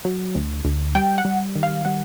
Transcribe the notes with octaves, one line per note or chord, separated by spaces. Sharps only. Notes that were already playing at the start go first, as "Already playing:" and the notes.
F#3
D2
D2
G3 G5
F#5
G3
D#3
F5
G3 F#5